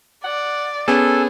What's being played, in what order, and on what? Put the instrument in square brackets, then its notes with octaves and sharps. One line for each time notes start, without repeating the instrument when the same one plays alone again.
[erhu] D5 [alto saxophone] F#5
[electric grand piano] B3 C#4 [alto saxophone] G#4 [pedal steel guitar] A4